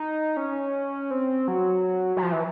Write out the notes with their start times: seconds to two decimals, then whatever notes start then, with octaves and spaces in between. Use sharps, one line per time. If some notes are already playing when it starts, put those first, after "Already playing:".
Already playing: D#4
0.37 C#4
1.11 C4
1.48 F#3
2.17 F#3
2.23 F3
2.32 E3